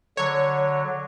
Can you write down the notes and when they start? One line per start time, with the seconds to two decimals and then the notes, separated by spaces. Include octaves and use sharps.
0.17 D3 F#3 C#5